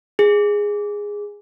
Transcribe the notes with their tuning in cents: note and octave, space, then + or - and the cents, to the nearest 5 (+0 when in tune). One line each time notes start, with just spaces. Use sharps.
G#4 -10